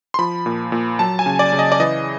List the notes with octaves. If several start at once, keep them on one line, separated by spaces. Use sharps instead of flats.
C6
F3 B5
A#2
A#2
F#3 A5
G#5
C#3
D5
C#3
D#5
D5
E3 D#5